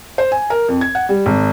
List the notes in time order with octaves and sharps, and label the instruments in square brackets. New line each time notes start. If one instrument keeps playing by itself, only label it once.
[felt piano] C5
G#5
A#4
F2
G#6
F#5
G3
G#1